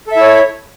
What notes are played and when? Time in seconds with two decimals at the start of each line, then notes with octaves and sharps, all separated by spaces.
0.07 A4
0.12 E5
0.16 E4
0.21 C#5